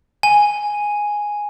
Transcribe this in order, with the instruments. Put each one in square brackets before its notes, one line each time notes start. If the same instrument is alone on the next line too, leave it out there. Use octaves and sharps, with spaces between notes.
[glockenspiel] G#5